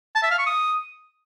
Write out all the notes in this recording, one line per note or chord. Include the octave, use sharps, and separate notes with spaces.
A5
E5
F5
C#6
D#6